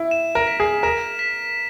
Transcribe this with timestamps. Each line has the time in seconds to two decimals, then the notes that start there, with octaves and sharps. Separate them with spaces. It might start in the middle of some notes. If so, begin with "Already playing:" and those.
Already playing: E4
0.11 E7
0.35 A#4
0.47 B6
0.60 G#4
0.83 A#4 E7
1.19 B6